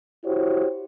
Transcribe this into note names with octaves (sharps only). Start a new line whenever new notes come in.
E4 F#4 G4 C5 C#5